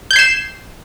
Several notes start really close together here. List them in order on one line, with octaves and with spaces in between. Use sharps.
G6 G#6 C7 E7